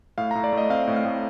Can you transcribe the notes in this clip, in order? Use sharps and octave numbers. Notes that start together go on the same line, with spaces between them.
A2 F5
A#5
A2
D5
A3 D#5
C4 F5
A2
F5
A2